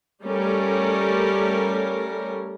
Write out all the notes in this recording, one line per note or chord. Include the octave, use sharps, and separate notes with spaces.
G3 A3 C#4 A#4